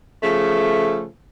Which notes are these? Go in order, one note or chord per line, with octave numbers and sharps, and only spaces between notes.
C#3 F3 A3